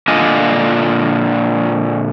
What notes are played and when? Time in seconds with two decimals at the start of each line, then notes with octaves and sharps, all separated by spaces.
0.08 A#2 D3 D4 F4 D#5 G#5